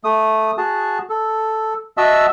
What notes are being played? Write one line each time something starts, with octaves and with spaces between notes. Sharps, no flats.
A3 D#6
F#4 G#4 A5
A4
F#4 D#5 E5 A5 E6